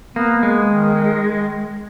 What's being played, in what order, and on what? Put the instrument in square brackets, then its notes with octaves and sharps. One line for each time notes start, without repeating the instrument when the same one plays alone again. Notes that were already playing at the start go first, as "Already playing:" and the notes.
[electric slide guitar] A#3 [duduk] B3
[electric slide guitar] G#3 [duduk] B3
[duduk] D#3